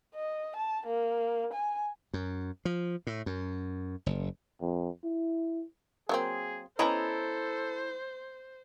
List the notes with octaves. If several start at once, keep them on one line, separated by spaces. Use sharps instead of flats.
D#5
A5
A#3
G#5
F#2
F3
A2
F#2
F#1
F2
E4
F#3 A#3 C4 G#4
B3 C#4 E4 A4 C5 D#5 A#5